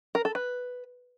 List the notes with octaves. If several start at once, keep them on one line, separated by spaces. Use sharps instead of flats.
A#4
A4
B4